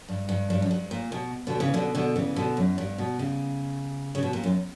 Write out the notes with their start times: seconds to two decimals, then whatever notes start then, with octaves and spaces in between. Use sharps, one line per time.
0.09 G2
0.29 G2
0.50 G2
0.62 F#2
0.71 G2
0.91 A#2
1.12 B2
1.47 B2 D3
1.60 C#3 E3
1.74 B2 D3
1.95 B2 D3
2.16 C#3 E3
2.36 B2 D3
2.57 F#2
2.78 G2
2.98 B2
3.19 C#3
4.15 C#3
4.23 B2
4.33 A#2
4.44 F#2